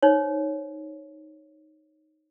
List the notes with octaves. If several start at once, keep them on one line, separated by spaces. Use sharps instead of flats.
D#4 C5 C#5